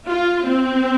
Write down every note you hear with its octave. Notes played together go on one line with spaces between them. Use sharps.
F4
C4